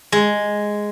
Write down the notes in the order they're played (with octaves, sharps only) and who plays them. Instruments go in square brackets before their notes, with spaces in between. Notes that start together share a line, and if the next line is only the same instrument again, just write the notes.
[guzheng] G#3